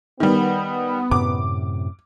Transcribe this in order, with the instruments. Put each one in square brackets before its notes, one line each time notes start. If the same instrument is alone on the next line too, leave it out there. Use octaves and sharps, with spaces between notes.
[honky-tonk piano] D#3 G3 [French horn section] B3
[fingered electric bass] F#2 A2 C3 [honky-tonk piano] D6